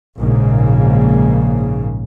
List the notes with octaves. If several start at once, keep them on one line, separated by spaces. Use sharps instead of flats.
A#1 G#2 C#3 A#3